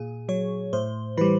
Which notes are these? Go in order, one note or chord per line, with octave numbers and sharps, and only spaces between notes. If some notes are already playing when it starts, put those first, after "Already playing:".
Already playing: A#2 G#4
F#3 C#5
A2 C5
E3 G3 B4